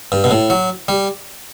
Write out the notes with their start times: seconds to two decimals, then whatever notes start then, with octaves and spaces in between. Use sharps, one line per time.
0.12 G2
0.24 B2
0.31 A2
0.50 F#3
0.88 G3